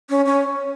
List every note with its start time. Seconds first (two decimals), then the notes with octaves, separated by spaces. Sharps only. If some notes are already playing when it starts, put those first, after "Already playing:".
0.10 C#4
0.25 C#4